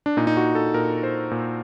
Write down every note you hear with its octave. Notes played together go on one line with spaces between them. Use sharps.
D4
A#2 D#4
D#4
F#4
A4
A#2 A#4
C5
A#2